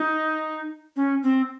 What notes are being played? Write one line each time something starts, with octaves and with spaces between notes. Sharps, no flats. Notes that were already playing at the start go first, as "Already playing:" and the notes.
Already playing: D#4
C#4
C4